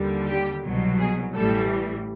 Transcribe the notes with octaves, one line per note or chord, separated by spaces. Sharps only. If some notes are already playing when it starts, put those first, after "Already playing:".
Already playing: D#2 D3 G3
G4
C2 B2 F#3
G#4
A1 A2 E3 G3 A4